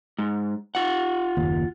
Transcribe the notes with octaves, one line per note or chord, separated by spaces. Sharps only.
G#2
F4 F#5
F#1 D#2